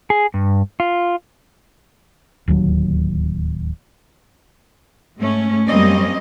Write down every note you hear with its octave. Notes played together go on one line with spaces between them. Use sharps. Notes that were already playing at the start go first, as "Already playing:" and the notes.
G#4
G2
F4
D1 D#2 F#3
G#2 A3 C#4
F#2 G3 A#3 C4 C#4 D#5